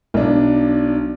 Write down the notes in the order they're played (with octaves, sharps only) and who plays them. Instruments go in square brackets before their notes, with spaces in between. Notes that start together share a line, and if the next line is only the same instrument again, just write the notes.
[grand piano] B1 D4